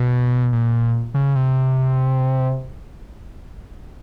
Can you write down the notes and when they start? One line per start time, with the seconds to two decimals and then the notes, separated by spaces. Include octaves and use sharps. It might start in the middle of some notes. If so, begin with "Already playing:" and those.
Already playing: B2
0.53 A#2
1.14 C#3
1.35 C3